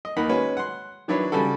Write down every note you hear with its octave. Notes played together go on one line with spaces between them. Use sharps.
D#5
D#2 A#3 D#4 F#5 B5
G#3 C#4 F#4 B4
F#5 C6
D#3 F#3 D4 E4 B4 C#5
C#3 G3 F#4 A4